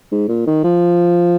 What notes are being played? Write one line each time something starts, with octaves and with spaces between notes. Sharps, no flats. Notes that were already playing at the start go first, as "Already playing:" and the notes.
G#2
A#2
D#3
F3